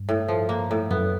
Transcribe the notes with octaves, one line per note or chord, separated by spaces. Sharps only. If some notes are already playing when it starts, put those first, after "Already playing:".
Already playing: G2
A2
F3
A#3
A2
F#2 B3